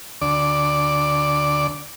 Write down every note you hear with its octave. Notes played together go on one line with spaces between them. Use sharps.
D2 D5